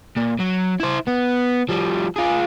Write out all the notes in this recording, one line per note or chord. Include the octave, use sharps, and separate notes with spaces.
A#2
F#3
E4 C5
B3
F3 G3
F4 G#4